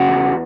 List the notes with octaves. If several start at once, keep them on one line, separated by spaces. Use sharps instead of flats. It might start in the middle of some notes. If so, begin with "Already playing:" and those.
Already playing: C#3 F#4
E2